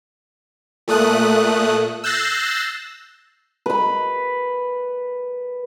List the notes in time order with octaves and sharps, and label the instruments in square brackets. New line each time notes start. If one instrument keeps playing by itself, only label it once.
[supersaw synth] A#2 A3 D#6 F#6
E6 F#6 G6 A6 A#6 C7
[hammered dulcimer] B4 B5